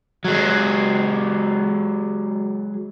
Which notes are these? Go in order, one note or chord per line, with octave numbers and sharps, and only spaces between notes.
F#3 G#3